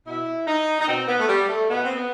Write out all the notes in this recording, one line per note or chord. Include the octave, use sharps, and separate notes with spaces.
B2 E4
D#4
D#4
B2 C4
B3
A3
G3
A3
B2 B3
C4
B3